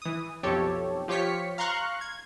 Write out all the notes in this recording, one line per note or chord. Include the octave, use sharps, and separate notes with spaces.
E3 D#6
B1 F2 G4 A4 C#5
F3 F4 G4 C#5 B6 C#7
F5 A#5 C6 C#6 F#6
G#6